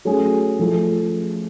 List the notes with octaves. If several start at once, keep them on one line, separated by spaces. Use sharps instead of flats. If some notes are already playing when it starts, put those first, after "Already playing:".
F#3 A3 C#4 G#4
F3 A3 F4